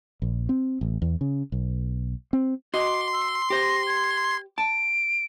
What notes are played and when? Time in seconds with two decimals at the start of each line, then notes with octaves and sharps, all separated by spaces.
0.22 A#1
0.49 C4
0.81 A1
1.02 E2
1.21 C#3
1.52 B1
2.33 C4
2.74 F#4 D#5 C6 D6
3.13 E6
3.50 G4 C5 A#6
3.87 G#6
4.58 A5 D7